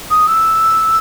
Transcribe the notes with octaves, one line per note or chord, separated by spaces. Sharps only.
D#6
E6